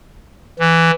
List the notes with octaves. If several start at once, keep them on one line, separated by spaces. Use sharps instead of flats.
E3